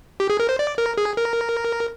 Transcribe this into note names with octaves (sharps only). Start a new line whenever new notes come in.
G4
G#4
A#4
C5
D5
A#4
G#4
A#4